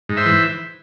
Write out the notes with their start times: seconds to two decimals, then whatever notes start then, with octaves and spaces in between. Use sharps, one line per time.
0.09 G#2
0.17 C5 E5
0.26 E3